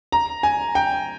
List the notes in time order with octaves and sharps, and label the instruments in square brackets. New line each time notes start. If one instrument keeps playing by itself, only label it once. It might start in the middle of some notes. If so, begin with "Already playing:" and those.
[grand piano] A#5
G#5
G5